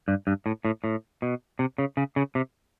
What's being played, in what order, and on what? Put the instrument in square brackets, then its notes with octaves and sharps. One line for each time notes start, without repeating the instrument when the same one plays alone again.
[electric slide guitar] G2
G2
A2
A2
A2
B2
C3
C#3
C#3
C#3
C3